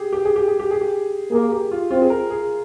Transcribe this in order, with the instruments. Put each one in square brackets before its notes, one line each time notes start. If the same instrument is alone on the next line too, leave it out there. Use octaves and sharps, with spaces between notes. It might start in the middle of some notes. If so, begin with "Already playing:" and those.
Already playing: [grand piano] G4 G#4
G4
G#4
G4
G#4
G4
G#4
G4
[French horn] A#3 [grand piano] G#4
[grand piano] G4
F4
[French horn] C4 [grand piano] F4
[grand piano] G#4
A#4
G#4